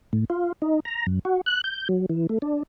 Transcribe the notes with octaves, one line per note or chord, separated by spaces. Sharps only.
A2
F4
D#4
A#5
F#2
F#4
F#6
G6
F#3
E3
A3
D4